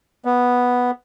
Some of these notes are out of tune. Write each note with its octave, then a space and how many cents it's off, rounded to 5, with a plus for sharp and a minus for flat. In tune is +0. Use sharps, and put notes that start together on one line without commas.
B3 -5